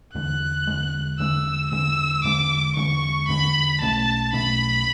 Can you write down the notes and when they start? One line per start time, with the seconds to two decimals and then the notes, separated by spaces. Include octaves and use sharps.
0.15 E2 D3 G#3 F#6
0.67 E2 D3 G#3
1.19 E2 D3 G#3 E6
1.71 E2 D3 G#3 E6
2.24 E2 D3 G#3 D6
2.76 E2 D3 G#3 C#6
3.29 E2 D3 G#3 B5
3.81 B1 B2 A3 C#4 A5
4.33 B1 B2 A3 C#4 B5